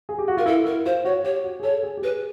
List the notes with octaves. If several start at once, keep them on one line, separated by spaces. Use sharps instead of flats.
G#4
G4
F#4
F4 A#4
E4 A4
E4 A#4
F4 C5
F#4 C#5
G4 C#5
F#4
G#4
A4 C#5
G#4
G4
G#4 B4